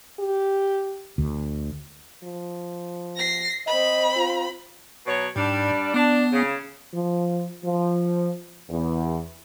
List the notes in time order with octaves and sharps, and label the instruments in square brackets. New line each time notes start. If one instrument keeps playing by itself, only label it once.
[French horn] G4
[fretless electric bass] D2
[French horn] F3
[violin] A#6 C7
[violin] C4 B5 [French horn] D#5
[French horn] F4
[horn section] B2 F#3 C#5
[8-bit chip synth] G#2 [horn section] G3 D4
[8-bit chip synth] B3 [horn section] D4
[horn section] C#3
[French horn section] F3
F3
E2